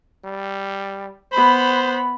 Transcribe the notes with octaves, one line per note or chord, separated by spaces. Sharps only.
G3
B3 C5 B5